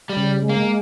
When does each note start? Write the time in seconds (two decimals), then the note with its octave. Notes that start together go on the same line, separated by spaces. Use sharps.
0.09 G3
0.17 C#3
0.43 G#3
0.49 A#3